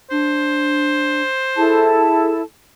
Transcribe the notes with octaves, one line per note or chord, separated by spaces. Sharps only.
D4 C5
E4 G#4 A4 A5